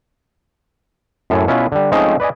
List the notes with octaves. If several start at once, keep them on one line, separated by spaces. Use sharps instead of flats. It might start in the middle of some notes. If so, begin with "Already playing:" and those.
F#2 A2 A4 G#5
B2 C#4 E4 F4 B4
D3 G3
F3 G#3 A3 C4 C#4 D#4
B4 D5 D#5 G#5